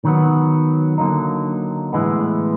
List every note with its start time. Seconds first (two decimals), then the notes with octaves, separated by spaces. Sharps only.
0.05 D#3 F#3 B3
0.98 D3 F#3 A#3 D#4
1.93 A2 E3 G#3 B3